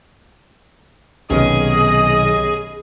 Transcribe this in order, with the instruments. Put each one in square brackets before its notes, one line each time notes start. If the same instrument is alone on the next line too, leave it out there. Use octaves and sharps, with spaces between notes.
[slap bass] B1 C3 D#3 [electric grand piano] B3 C#4 [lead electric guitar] G#4 [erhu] D#5